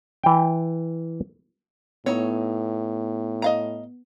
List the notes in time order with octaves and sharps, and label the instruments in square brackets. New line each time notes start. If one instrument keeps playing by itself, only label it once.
[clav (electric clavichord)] E3 G5
[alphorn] A2 [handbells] B3 [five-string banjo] D#4 C#5
[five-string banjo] D#5 F5 A#5